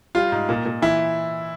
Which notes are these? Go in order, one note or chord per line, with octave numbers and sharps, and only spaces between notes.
G3 F4
G#2
A#2
A#2
E3 E4